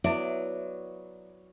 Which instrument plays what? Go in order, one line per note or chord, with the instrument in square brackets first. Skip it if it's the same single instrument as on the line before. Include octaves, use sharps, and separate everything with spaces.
[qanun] F#3 B3 [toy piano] E4 E5 [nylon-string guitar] D5